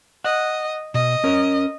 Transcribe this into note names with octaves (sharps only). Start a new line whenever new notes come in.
D#5 F#5
B2 D#5
C#4 A#4 C#5